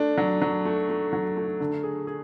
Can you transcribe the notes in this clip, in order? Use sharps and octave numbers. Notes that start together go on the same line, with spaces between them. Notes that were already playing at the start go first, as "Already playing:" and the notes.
Already playing: A3 D4
F#3
F#3
A3
A3
F#3
A3
D3
G#4
G#4